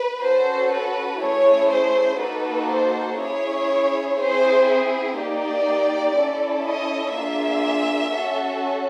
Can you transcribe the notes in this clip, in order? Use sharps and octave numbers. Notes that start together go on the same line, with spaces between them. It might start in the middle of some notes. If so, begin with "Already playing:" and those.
Already playing: B4
C#4 F#4 A4 C5
B4
A3 C#4 E4 G#4 C#5
C5
A#3 D#4 F#4 A4 B4
C5
C#4 E4 G#4 C#5
C4 E4 G#4 C5
A#3 D#4 G4 D5
C#4 E4 A4
D#5
A#3 D4 F4 G#4 E5
C#4 F#4 A4